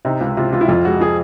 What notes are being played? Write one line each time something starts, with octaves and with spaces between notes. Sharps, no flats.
C3 D#4
C#2
C3 F4
C#2 F4
E4
F2 F4
G#3 F#4
F3 G#4